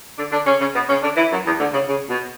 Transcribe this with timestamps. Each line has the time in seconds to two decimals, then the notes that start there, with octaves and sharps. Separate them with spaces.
0.17 D3 D4
0.31 D3 D4
0.46 C#3 C#4
0.60 C#3 C#4
0.74 B2 B3
0.88 C#3 C#4
1.02 D3 D4
1.16 E3 E4
1.31 F#2 F#3
1.45 E2 E3
1.59 D2 D3
1.73 C#3
1.88 C#3
2.09 B2